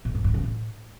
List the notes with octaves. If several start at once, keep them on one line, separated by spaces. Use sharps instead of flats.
A2
G#2
G2
C#3
A2